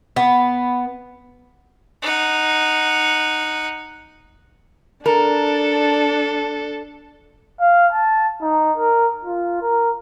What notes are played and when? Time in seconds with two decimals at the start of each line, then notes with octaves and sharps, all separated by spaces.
0.16 B3
2.02 D#4 F#5
5.06 D4 A4 A#4
7.60 F5
7.92 A5
8.42 D#4
8.77 A#4
9.24 F4
9.62 A#4